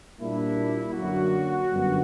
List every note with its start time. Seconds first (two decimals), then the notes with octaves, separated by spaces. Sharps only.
0.20 A#2 G3 A#3 D4 E4
0.94 F#2 D3 F#3 A#3 F#4
1.69 G1 F#2 D3 G3 B3